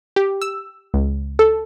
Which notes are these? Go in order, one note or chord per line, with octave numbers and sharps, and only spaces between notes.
G4
E6
C#2
A4